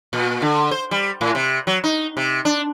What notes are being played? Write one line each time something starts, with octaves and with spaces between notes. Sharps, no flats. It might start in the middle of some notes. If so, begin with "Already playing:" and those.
A#2
D3
C5
G3
A2
C3
F#3
D#4
C3
D4